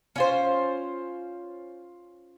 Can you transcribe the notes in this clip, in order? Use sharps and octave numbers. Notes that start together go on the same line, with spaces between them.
C#4 F4 C5